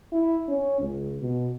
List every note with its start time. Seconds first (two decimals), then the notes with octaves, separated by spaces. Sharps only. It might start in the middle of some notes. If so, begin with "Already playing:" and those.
0.12 E4
0.48 C#4
0.80 C#2
1.22 B2